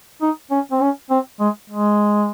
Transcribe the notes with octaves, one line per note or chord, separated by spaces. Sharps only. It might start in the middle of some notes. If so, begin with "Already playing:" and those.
D#4
C#4
C4
C#4
C4
G#3
G#3